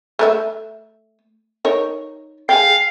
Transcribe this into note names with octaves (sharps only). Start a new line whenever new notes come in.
A3 A#4 E5
D#4 A#4 C#5
G#4 F5 G5